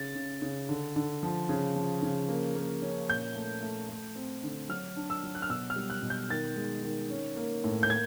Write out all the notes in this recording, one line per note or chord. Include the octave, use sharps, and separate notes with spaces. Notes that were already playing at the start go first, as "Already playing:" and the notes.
Already playing: C#3 A6
C#3
C#3
D3
D3
F3
C#3
F3
C#3
A#3
A#3
C#4
A#2 G6
A3
A3
A3
C4
D3
F#3 F6
D4
E6
F#3
F#6
F6
B2 E6
F6
G3
F#6
B2
G6
D#3 A6
G#3
D#3
C#4
A#3
A2
G6
A#3 G#6